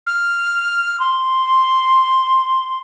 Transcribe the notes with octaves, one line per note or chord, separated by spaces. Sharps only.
F6
C6